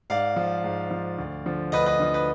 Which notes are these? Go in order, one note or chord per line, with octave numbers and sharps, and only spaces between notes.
G#2 D5 F5
F3
G#2
F3
D2
D3 F3
D2 B4 D#5
B4 D#5
D3 F3
B4